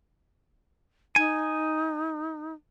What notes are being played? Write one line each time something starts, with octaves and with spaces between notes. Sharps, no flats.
D#4 G#5